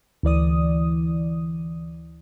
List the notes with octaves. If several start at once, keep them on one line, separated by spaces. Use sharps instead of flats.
D2 E3 D5 D#6